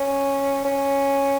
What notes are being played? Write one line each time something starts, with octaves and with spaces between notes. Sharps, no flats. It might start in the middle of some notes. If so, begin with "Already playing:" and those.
Already playing: C#4
C#4